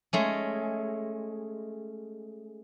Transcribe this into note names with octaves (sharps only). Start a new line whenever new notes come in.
G#3 A3 C#4